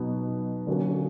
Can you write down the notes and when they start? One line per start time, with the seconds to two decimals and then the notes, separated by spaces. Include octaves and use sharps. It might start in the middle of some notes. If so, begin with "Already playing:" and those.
Already playing: B2 F#3 B3 D#4
0.67 D3 F#3 A#3 C#4 F#4